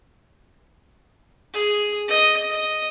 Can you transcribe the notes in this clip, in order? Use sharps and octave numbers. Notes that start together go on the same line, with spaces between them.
G#4
D#5
D#5